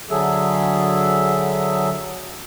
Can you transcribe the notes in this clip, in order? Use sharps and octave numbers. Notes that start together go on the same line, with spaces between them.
D3 F#3 G#4 A4 E5